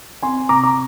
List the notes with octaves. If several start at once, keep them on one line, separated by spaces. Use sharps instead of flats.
C4 G#5 C6
C3 A#5 D6
D6